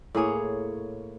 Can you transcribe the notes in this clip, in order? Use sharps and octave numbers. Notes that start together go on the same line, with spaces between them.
A2 A#3 G#4 C#5